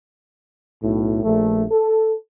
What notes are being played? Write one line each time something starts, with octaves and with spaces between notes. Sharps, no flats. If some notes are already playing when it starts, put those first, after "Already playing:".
B1 A2
A#1 A3
A4